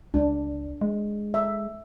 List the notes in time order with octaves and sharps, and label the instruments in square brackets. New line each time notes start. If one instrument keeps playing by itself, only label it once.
[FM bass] C#2 [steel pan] D4
[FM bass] G#3
[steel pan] E5